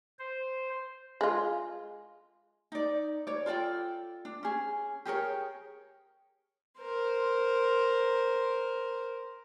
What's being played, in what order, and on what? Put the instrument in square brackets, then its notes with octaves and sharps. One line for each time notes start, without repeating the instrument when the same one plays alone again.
[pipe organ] C5
[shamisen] G#3 F4
[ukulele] D#4 D5
C#5 D5
F4 A4 D5 G5
D4
C#4 G#4
G4 G#4 A#4 C#5
[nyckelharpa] A#4 C5